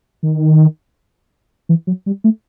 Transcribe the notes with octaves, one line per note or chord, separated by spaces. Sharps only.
D#3
E3
F#3
G3
A3